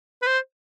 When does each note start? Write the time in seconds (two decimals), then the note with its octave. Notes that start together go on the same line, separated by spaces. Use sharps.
0.22 B4
0.27 C5